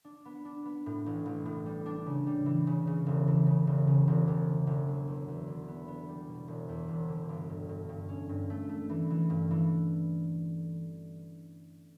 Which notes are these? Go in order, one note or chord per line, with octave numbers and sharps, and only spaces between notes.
D4
B3
D4
B3
A2
A1
A1
A2
G3
D4
C#3
G3
E3
C#3
C#3
E1
E3
C#3
E1
C#3
E1
E1
D3
E1
F#3
E2
E2
D3
B3
B3
G3
B2
E1
E2
E1
D3
G1
G2
G2
G2
C#4
G2
A3
A3
E3
E3
G2
E3